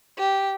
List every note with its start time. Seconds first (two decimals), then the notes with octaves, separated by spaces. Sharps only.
0.18 G4